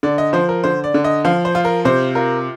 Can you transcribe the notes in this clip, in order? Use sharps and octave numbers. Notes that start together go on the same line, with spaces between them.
D3 D5
D#5
F3 C5
A#4
D3 C5
D5
D3
D#5
F3 F5
C5
F4
A#4
C3 C5
F4 A#4